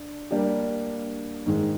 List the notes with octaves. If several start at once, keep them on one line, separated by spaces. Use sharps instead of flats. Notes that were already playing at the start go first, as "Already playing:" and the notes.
Already playing: D4
G3 A#3 D4 G4
G#2 D#3 G#3